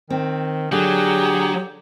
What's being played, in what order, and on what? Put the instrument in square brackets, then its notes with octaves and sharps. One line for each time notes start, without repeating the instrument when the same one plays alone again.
[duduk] D#3 [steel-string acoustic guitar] C4
[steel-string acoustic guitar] D3 [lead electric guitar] F#3 [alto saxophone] G4 [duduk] G#4